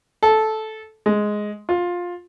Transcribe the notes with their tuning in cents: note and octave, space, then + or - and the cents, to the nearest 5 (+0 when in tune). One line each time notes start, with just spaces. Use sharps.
A4 -10
G#3 +5
F4 +15